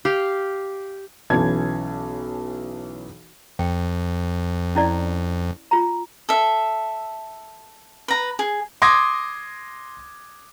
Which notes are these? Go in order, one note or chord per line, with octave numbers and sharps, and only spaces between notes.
G4 F5
B1 E3 C#4 A5 G#6
F2 G5
C#4 E4 D5
F4 A#5
A4 E5
B4 A#5
G#4
C6 D6 D#6 G#6 A#6